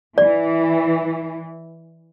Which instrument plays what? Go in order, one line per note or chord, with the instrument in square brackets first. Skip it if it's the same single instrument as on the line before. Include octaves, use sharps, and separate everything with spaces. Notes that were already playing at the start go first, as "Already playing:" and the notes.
[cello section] E3 [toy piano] D5